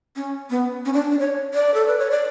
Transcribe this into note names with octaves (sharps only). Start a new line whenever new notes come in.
C#4
B3
C#4
D4
D4
C#5
D5
A4
B4
C#5
D5